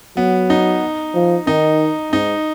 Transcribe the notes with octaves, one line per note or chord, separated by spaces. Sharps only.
F#3 B3
D#4
F3
D#3 D#4
G#2 D#4